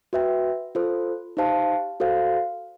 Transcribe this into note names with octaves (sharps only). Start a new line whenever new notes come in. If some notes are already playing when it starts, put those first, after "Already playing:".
F#4 B4 E5 G5
F4 A4 C5
D#4 G4 C5 F5 A5
F#4 A4 C5 F5